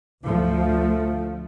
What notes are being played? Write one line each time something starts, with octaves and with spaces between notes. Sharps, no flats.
D2 F3 A3